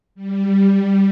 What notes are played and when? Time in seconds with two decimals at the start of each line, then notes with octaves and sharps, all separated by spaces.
0.15 G3